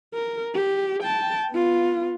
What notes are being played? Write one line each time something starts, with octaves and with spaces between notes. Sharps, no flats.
A#4
G4
G5 A5
B3 F4